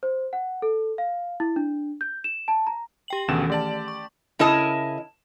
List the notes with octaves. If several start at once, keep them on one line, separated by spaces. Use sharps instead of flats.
C5
F#5
A4
F5
E4
D4
G6
E7
A5
A#5
G4 G5 F#7
D2 B2 D#3 E3 C#4 E7
A3 G4 D5 A5 F#7
C#6
C#3 E4 A#4 D#5 A5